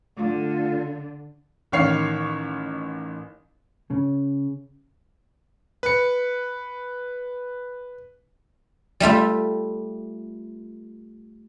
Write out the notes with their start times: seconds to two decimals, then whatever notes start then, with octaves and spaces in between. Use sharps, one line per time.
0.17 D3 A3 F4
1.72 A1 D#3 C#5 F5 C7
3.90 C#3
5.83 B4 C#7
9.00 G3 A3 F4 E5